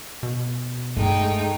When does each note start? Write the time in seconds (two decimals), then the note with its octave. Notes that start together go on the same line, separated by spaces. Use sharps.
0.23 B2
0.97 G2 G#3 A3 D#4 E4 G5